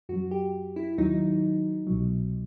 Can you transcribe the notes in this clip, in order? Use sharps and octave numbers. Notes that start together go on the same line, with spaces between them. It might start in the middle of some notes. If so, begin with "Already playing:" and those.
F#2 F#3 F#4
G4
E4
D#2 D#3 F#3 D#4
C2 B2 F#3